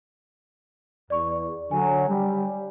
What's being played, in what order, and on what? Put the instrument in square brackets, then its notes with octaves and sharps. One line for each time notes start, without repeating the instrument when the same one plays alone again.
[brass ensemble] E2 [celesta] D5 C#6
[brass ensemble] D3 F#3 [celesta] G#5
[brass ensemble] G3